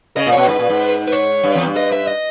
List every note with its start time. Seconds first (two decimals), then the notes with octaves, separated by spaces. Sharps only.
0.17 C#3 D#5
0.26 A#2
0.32 B2 C#5
0.48 G#2 B4
0.59 A#2
0.69 G#2
1.08 B4
1.12 C#5
1.43 G2
1.55 E2
1.66 G2
1.77 D#5
1.93 E5
2.07 D#5